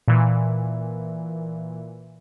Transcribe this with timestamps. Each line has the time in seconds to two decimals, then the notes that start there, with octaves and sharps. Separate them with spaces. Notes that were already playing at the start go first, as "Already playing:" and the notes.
0.08 A#2 E3